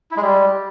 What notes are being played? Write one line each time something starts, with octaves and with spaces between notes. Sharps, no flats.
E4
G#3
G3